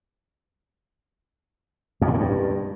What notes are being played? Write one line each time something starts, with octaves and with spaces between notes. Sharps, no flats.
F2
A2
G#2
G2